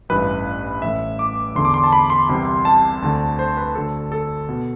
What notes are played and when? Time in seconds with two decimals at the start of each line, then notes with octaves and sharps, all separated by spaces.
0.09 A1 G2 E3 B4
0.82 A1 A2 E3 E5
1.19 D6
1.55 E2 D3 C6
1.65 D6
1.74 C6
1.84 A5
1.93 B5
2.10 C6
2.29 C2 C3 E3
2.65 A5
3.02 D2 D3
3.39 C5
3.57 B4
3.75 D2 D3 A4
4.12 A4
4.49 B2